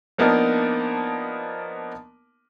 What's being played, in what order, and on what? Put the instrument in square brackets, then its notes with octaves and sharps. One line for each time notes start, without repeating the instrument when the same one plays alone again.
[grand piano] F3 A#3 B3 D4 D#4 A#4